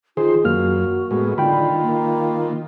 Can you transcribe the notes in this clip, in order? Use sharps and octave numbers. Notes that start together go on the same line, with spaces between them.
D#3 F4 G#4 C5
F#2 A#3 F#4 F6
A2 G#3 B3
D3 D#3 F4 G5 B5
A#3